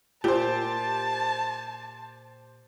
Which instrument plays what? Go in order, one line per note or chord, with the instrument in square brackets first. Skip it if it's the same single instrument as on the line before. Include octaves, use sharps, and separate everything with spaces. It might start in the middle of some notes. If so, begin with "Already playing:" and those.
[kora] A#2 [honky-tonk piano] G4 C5 [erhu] A5